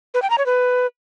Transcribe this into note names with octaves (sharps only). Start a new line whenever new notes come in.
B4
G5
A#5
C#5
B4